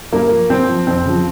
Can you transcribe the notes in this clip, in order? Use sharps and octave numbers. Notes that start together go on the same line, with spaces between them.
G2 A#3
F3
G2 C4
F3
F2 C4
C#3 F3